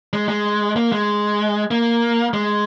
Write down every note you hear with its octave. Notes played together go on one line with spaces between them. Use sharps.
G#3
G#3
A#3
G#3
A#3
G#3